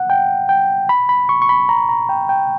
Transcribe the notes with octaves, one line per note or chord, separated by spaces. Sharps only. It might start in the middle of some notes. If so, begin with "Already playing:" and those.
Already playing: F#5
G5
G5
B5
B5
C#6
C#6
B5
A#5
A#5
G5
G5